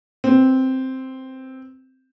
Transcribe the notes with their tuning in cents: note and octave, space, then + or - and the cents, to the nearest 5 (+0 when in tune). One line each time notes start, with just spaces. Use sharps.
C4 +0 B4 +0